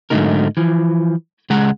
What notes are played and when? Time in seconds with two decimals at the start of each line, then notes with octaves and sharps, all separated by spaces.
0.10 G#2 D3 F#3 A3 D#4 A#4
0.57 E3 F3
1.50 C#2 G#3 F#5 A#5